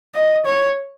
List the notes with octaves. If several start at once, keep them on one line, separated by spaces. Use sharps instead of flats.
D#5
C#5